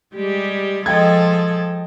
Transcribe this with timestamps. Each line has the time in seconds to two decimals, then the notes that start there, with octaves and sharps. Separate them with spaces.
0.14 G3 G#3 G4
0.86 F3 G#3 A4 D#5 G5 G#6